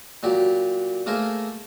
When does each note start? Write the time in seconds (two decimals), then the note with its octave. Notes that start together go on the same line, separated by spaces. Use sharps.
0.23 A#2 F#3 G4
1.06 A3 A#3 G#4 A#4 C5